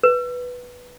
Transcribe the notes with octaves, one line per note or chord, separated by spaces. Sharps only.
B4